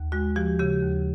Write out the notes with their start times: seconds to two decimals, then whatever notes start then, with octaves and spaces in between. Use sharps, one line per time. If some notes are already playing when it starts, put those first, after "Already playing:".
Already playing: D#2
0.12 G#3 F#4
0.36 F3 G4
0.59 C#3 G4
0.83 D#2